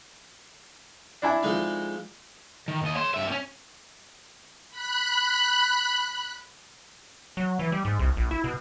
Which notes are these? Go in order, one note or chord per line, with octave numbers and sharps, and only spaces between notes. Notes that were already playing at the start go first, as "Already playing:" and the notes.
D4 E4 G#5
F2 G#3 D#4
D#3
D#2 D#5
C#5 C6
G2 E5
G3 C#4
B5 F#6
F#3
E3
G3
G#2
C2
A#1
E4
B2